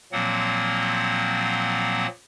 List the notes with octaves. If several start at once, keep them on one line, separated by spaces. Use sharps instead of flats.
A#2 F3 F#3 A#3 C4 F#5